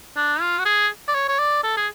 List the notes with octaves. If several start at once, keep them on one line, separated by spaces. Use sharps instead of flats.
D4
F4
F#4
G#4
D5
C#5
C#5
D5
A4
G#4